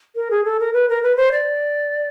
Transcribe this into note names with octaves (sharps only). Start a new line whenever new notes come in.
A#4
G#4
A4
A#4
B4
A#4
B4
C5
D5